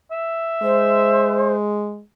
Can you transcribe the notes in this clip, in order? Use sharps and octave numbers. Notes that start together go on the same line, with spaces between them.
E5
G#3 C5